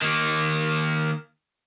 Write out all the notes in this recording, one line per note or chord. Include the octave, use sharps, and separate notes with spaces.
D#3 A#3